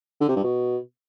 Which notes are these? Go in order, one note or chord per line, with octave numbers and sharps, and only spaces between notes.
D3
C3
G2
B2